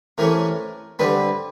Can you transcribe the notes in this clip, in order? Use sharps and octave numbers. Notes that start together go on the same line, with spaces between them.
C3 E3 A3 C#4 A#4
D3 G3 C4 B4